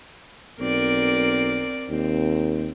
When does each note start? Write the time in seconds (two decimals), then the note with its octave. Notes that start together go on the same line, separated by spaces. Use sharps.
0.60 B1 C4 A#4 D5
1.89 D#2 C4